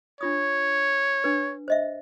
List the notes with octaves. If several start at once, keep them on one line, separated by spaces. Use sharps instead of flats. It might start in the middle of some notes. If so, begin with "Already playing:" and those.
D4 F4 C#5 D#6
D4 B4
C5 D#5 E5